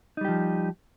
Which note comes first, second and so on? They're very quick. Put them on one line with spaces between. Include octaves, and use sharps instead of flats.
D#4 G3 G4 F3